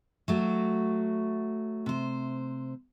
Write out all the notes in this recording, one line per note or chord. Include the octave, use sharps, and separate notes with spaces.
F#3 A3 F#4
C3 C5